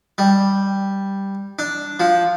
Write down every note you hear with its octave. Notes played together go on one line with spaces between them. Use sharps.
G3
D4
F3